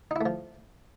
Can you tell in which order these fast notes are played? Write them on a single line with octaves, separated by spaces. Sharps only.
D#4 E4 A3 F3